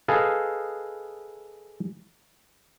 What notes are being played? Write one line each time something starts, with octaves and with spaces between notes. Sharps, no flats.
G#4 A4 B4 D#5 F5